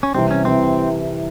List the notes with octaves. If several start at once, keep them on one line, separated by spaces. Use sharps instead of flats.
C#4
C2 C3 E3 C4
C#4
C3 E3 C4